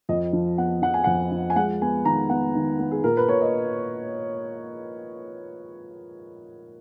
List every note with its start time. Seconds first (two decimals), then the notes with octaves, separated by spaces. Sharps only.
0.09 F2 D#5
0.33 F3
0.58 B3 F#5
0.82 F3 F#5
0.94 G#5
1.04 F2 F#5
1.32 F3
1.50 G#5
1.56 G#3 F#5
1.82 B3 G#5
2.05 D#3 A#5
2.30 B3 F#5
2.55 D#3
2.79 B3
2.91 G#4
3.04 A#2 A#4
3.17 B4
3.28 A#2 C#5
3.41 D#5